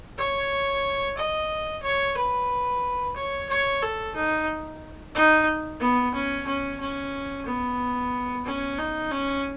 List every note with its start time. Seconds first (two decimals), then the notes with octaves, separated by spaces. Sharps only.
0.18 C#5
1.17 D#5
1.83 C#5
2.17 B4
3.16 C#5
3.49 C#5
3.82 A4
4.15 D#4
5.15 D#4
5.80 B3
6.14 C#4
6.46 C#4
6.80 C#4
7.46 B3
8.45 C#4
8.78 D#4
9.11 C#4